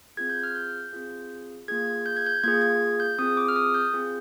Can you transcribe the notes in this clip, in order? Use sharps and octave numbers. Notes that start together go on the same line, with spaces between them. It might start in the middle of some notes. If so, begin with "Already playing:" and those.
C4 F4 G#4 G#6
G6
F6
G6
C4 F4 G#4
A#3 F4 G#4 G#6
G6
G#6
G6
A#3 F4 G#4 G#6
G#6
G6
C4 F4 G#4 D#6
D6
F6
D#6
G6
C4 F4 G#4